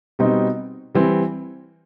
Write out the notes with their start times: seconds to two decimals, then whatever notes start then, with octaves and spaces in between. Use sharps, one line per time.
0.19 B2 G3 C4 D#4
0.95 E3 G3 C4